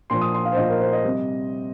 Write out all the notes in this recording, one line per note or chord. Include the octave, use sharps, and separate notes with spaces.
A#2 F3 C6
D#6
C6
F5
C5
A#2 F3 D#5
A#4
C5
D#5
C3 G3